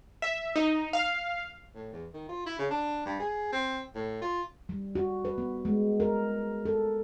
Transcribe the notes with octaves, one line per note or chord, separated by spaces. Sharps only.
E5
D#4
F5
A2
E2
D#3
F4
E4
C#3
D4
G2
G#4
C4
A2
F4
G3
F#4
B4
B3
G#3
A#4
A4